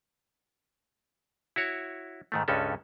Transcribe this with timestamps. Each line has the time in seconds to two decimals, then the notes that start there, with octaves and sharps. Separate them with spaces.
1.56 E4 F#4 C#5
2.32 G#2 D#3 A3
2.48 C#2 G2 G3 G#3 C#4 A4